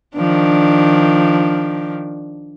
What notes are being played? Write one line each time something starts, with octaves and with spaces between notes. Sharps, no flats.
D#3 F3 D4